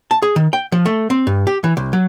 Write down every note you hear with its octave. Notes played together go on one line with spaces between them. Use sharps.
A5
G#4
D#3
G5
F3
A3
C4
G2
G4
E3
C2
F#3